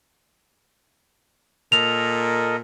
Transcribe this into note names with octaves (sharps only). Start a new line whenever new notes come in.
A#2 A4 A#4 D#5 F7